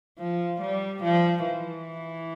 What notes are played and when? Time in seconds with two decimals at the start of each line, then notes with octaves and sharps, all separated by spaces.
0.18 F3
0.61 G3
1.03 F3
1.46 E3